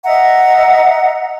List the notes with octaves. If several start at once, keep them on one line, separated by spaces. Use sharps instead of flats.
D#5 E5 F#5 A#5